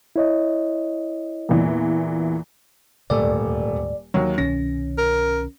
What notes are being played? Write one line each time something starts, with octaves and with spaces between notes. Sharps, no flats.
E4 C#5 D#5
E2 A#2 E3
D#1 D2 G#2 A3 D5
D#2 F#3
C2 B2 D#3 C#4 A#6
A#4